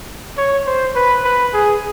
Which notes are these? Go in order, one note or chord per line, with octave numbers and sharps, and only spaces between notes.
C#5
C5
B4
B4
G#4